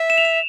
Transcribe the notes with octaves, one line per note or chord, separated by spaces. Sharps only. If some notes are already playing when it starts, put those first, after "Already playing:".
Already playing: E5
E7
F7
E7